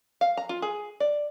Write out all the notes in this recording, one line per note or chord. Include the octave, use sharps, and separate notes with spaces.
F5
A#5
F4
G#4
D5